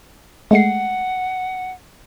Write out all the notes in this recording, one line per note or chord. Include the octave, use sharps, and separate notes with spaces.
G#3 A3 F#5 C7